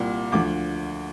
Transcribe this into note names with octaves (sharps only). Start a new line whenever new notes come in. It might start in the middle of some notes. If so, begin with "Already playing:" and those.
Already playing: C2 A#2 G3
D2 D3 F3 D6